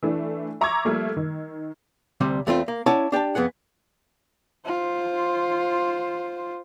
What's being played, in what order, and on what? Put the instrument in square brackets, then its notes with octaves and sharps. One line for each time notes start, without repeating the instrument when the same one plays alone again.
[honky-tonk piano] E3 A3 D4
E5 A#5 C#6 D6 E6 G#6
F3 G3 A3 A#3
D#3
[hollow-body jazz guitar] D2 C3 G3
E2 A3 C4 F4
A#3
C#4 E4 C#5 D5 F#5 A5
D4 G4 G5 A5
F2 B3 G#4 F#5
[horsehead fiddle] F4 C5